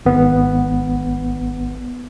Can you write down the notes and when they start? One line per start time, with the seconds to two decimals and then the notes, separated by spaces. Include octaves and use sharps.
0.06 G#1 B3